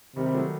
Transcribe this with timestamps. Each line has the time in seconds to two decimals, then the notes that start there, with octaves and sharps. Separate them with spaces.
0.16 C3 D#3 G3
0.26 G3
0.34 F#3 A3